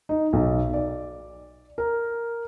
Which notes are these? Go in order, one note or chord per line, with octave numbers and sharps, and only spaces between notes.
D#4
B1
D5
A#4